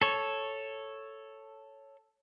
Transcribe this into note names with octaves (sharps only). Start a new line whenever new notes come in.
A4 C#5